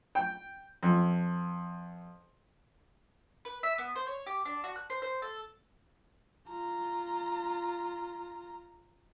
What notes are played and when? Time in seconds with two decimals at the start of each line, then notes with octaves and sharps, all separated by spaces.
0.15 G5
0.83 F2
3.45 B4
3.63 E5
3.78 B3
3.96 C5
4.07 C#5
4.27 G4
4.45 D4
4.64 F#4
4.76 F#6
4.90 C5
5.02 C5
5.22 A4
6.49 F4 A#5